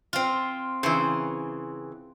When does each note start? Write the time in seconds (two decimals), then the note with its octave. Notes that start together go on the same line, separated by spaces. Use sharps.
0.13 C4 F4
0.83 C#3 E3 C5